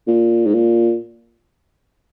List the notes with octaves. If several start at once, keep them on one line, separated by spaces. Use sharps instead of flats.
A#2
G#2
A#2